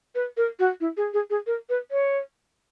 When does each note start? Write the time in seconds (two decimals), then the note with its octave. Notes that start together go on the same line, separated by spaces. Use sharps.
0.15 B4
0.37 A#4
0.59 F#4
0.81 E4
0.97 G#4
1.14 G#4
1.30 G#4
1.47 A#4
1.69 B4
1.91 C#5